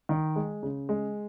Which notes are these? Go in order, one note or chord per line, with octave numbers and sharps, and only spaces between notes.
D#3
G#3
C#3
G#3